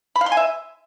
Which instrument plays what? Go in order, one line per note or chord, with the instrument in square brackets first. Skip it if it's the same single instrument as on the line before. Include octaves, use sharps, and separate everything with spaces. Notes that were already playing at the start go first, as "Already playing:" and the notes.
[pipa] B5
F5
C6
G#5
E5